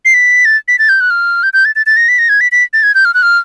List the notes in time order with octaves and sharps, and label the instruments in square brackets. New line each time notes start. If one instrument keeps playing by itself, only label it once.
[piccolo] C7
B6
A6
B6
A6
G6
F#6
F6
G6
G6
A6
A6
A6
A#6
B6
A#6
G#6
B6
B6
A6
G#6
G6
F6
F#6
F6